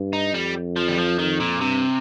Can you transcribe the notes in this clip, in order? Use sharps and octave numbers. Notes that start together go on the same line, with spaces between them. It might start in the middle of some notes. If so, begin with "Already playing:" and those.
Already playing: G2
D#4
F2 G3
F3
G3
F3
D#3
A#2
G2 C3